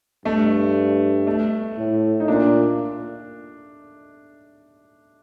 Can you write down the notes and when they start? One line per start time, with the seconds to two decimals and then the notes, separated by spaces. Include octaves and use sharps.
0.25 G2 A3
1.27 A3
1.77 A2
2.20 D#4
2.28 A#2 D4